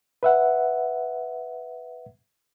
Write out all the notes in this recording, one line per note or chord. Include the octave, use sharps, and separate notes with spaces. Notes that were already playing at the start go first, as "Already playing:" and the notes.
B4 E5 F#5